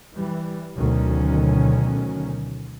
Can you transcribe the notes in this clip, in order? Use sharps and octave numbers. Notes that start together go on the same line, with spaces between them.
E3 G3
D2 B2 D#3 F#3 C#4